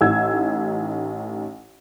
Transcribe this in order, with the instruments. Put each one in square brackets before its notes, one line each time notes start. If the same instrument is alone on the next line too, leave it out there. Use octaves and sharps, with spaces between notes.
[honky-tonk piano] A1 D#4 E6 G#6